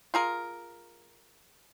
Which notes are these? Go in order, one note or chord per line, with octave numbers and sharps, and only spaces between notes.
F4 G#4 A#4